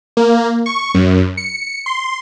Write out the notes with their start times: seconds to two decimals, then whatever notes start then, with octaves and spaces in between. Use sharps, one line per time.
0.17 A#3
0.66 C#6
0.94 F#2
1.37 C#7
1.86 C6